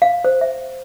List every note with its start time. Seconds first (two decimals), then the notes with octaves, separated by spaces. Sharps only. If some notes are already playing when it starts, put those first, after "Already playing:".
0.02 F5
0.24 C5
0.41 E5